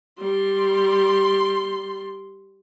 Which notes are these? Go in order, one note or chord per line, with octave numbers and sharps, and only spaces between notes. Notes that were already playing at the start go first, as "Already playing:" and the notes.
G3 C6